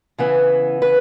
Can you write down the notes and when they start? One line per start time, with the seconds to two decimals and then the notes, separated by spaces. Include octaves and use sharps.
0.18 C#3 E3 B3
0.82 B4